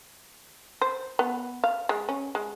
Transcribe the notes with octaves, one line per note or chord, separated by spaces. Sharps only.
C5
B3
F5
G#3
C#4
G#3